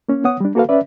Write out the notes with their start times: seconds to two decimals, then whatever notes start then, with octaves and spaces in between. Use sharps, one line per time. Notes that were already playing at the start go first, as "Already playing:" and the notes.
0.09 A#3 C#4
0.24 B3 C#5 F#5 D#6
0.40 G3 D4
0.55 A#3 F#4 A4 B4 F5
0.69 C#4 B4 D5 E5